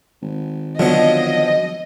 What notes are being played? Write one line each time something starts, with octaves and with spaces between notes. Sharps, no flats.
G#1
D3 F3 F#3 B3 D#5